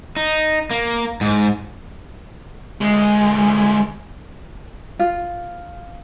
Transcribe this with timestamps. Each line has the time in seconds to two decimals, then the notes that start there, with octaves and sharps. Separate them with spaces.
0.17 D#4
0.71 A#3
1.21 G#2
2.81 D2 G#3
4.99 F4